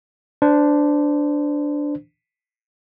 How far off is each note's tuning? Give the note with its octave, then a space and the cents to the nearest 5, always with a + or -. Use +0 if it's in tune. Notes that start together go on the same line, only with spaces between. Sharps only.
D4 +0 C5 -25